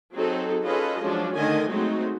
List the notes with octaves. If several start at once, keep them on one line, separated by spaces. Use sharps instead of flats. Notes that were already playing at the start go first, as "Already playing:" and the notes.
F#3 C4 D#4 G#4 A4
C#4 F4 G#4 A4 B4 D#5
F3 F#3 G#3 C#4 D4
D3 D#3 A3 D#5 G#5
F#3 G#3 A3 C4 D#4 F#4